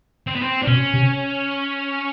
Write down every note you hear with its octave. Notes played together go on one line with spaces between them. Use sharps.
C4
B3
C4
D4
B2 C#4
C3